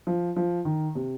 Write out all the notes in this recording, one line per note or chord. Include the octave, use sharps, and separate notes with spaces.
F3
F3
D#3
C3